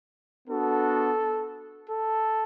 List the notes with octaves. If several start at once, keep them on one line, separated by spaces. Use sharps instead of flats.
B3 D4 F#4 A4
A4